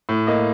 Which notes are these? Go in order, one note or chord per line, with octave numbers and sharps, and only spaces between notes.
A2
A#3 D#5